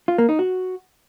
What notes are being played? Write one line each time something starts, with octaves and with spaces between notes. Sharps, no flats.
F4
A#3
D#4
F#4